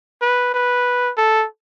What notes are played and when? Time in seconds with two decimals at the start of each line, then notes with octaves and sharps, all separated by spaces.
0.22 B4
0.54 B4
1.17 A4